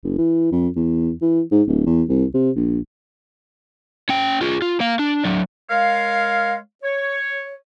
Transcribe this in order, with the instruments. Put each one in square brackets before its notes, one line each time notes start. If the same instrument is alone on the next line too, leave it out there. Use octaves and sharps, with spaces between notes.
[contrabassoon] F#1
E3
F2
E2
E3
G#2
D1
E2
C2
C3
A#1
[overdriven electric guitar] C#4 G5
F4 G#4
F4
A#3 F5
D4
F#3 D4
[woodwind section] G#3 A#4 C#5 F5
C#5